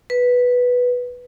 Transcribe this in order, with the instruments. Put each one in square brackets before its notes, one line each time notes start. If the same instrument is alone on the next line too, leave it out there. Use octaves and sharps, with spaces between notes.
[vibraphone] B4